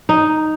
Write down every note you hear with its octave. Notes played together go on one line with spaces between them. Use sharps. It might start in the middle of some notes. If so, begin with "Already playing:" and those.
D#4